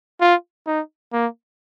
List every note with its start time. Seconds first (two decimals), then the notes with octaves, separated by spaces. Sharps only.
0.21 F4
0.66 D#4
1.13 A#3